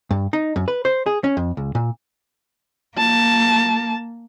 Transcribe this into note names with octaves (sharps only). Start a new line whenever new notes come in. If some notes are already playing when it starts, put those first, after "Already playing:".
G2
D#4
F#2
B4
C5
G#4
C#4
F2
C#2
A#2
A#3 A5